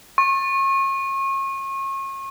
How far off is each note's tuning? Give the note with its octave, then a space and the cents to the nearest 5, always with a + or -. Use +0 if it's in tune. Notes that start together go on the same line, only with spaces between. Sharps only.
C#6 -35